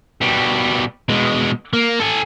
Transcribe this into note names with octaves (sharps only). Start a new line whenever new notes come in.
B2 G3
B2 G#3
A#3
A4 G#5